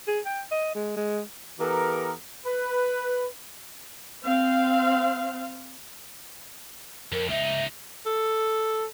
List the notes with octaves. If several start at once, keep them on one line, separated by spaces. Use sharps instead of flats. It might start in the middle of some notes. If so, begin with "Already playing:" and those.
G#4
G5
D#5
G#3
G#3
E3 B3 G4 A4 A#4
B4
C4 F5
F2 A#4
C#2 D#4 E5
A4